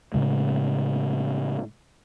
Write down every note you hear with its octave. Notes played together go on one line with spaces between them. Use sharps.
A2 C#3 G#3